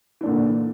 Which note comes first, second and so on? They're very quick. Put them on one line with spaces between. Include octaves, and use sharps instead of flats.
E3 D4 A#2 D3